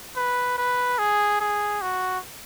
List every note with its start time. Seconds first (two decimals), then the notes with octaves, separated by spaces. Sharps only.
0.16 B4
0.58 B4
0.99 G#4
1.40 G#4
1.82 F#4